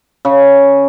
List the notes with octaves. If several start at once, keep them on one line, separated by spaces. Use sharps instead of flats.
C#3